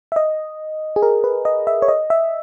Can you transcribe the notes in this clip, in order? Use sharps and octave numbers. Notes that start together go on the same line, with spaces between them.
E5
D#5
G#4
A#4
B4
D#5
E5
C#5
D#5
E5